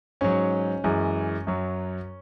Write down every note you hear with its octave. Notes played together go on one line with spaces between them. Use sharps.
G#2 F#3 C#4
F#2 E3 G#3
F#2 F#3